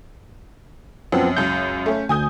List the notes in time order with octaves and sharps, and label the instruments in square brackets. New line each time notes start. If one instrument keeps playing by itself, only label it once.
[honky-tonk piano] F#2 [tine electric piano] F3 B3 C4
[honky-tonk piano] C#2 F#2 [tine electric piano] G6
[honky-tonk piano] A3 C#4
[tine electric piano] D2 [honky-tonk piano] G#5 D#6 G6